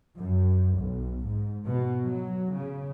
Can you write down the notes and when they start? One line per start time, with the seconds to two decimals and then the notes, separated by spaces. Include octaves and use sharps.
0.18 F#2
0.77 B1
1.24 G#2
1.65 B2
2.06 F#3
2.53 C#3